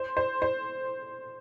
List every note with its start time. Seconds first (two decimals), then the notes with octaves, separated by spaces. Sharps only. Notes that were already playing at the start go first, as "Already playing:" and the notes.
Already playing: C5
0.17 C5
0.42 C5